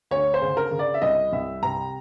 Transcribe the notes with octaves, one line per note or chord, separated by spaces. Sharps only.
D2 C#5
C5
C#3
A#4
C#3
D5
E5
C2 D#5
C2 E5
C3 A#5